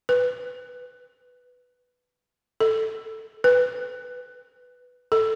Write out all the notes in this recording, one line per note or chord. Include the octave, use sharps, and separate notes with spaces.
B4
A4
B4
A4